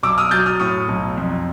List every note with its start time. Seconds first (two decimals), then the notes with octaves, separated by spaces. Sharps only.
0.03 B1 D6 E6
0.18 D#6 F6
0.31 F#3 G6 A6
0.46 D#6 F6
0.60 A2 C#6 D#6
0.88 B1
1.18 F2